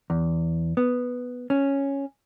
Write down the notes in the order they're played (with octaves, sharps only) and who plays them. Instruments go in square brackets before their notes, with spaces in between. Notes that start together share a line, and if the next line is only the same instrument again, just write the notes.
[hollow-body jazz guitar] E2
B3
C#4